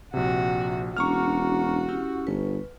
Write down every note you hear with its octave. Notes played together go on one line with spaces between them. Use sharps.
A#1 C3 F#4
E1 C#4 D4 F#4 A#5 C#6 F6
C#4 E4 G4
G1 B4